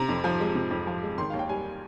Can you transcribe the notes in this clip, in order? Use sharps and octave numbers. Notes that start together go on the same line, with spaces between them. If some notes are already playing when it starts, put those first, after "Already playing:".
Already playing: C3 A#5
F2
F3
G#3
C3
F2
F3
G#3
D#3 C6
D#2 F5
G5
G3 G#5